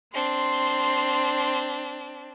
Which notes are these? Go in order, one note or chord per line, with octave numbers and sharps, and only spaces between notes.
C4 D4 C6